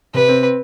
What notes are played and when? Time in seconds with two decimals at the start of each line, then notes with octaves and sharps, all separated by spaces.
0.14 C3 B4
0.28 C4